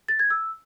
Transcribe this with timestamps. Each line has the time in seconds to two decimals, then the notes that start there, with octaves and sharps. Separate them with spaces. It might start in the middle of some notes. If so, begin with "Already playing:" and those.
0.08 A6
0.19 G#6
0.30 E6